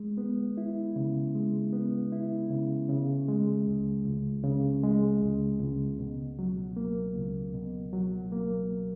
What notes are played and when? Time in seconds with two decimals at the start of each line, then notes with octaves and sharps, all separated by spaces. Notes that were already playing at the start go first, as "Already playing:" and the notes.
Already playing: G#3
0.18 B3
0.57 E4
0.96 C#3
1.35 G#3
1.73 B3
2.12 E4
2.50 C#3
2.89 C#3
3.28 G#3
3.67 C#2
4.05 C#2
4.44 C#3
4.83 G#3
5.22 C#2
5.60 C#2
5.99 B2
6.39 F#3
6.77 A#3
7.16 C#2
7.54 B2
7.93 F#3
8.32 A#3